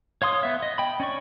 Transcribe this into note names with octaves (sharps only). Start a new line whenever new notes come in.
C#5 F5 C6 D#6
B3 E5
D#5
G5 B5
C#4 D5 C#6